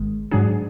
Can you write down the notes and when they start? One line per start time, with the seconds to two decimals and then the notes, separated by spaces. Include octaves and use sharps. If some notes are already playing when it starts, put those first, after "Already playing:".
Already playing: G#1 G#2 D#3 G#3
0.31 G#2 F#3 D4 G#4